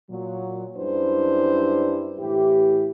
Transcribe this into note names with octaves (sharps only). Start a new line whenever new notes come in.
A#2 F#3
F#2 G3 D4 E4 B4 C5
A2 E3 E4 G4